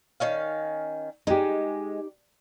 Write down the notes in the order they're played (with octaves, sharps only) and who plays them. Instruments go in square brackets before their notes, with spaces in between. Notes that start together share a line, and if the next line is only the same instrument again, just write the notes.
[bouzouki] D#3 C#4 F5
[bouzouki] G#3 [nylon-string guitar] D#4 G4